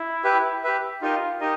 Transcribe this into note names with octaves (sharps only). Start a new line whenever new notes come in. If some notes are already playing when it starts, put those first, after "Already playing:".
Already playing: E4
G4 B4 E5
G4 B4 E5
D#4 F4 G4 A#4 D#5
D#4 G4 A#4 D#5